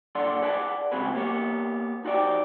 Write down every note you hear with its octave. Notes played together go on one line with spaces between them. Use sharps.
A#2 D4 A4 D5 F#5 C6
G#4 B4 D5 F#5 A5
G#2 C#3 C4 F#4 G#4 B4
A#3 B3 G4 C#5
D#4 F#4 G4 D5